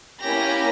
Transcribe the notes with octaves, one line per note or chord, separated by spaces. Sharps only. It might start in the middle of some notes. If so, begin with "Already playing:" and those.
A#3 C#4 E4 G4 A#6